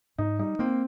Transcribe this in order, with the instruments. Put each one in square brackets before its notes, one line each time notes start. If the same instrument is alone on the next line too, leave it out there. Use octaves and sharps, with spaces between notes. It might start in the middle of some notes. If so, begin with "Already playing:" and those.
[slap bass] G#2 [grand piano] D#4
[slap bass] G3 [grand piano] D#4
[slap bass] A#3 [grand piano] C4